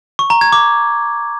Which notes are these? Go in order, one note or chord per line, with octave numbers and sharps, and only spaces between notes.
C#6
A#5
G#6
D6